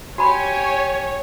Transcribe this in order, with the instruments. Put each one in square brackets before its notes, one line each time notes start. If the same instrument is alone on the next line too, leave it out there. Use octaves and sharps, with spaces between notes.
[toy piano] F#4 B5 [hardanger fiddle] G4 G#5 [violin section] C#5